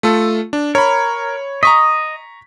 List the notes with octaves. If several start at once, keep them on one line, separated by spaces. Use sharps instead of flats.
A3 F4 A4
D4
A#4 C#5 B5
D#5 A#5 C#6 B6